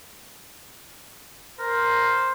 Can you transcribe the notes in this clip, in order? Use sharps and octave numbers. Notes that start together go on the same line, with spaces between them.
A#4 C5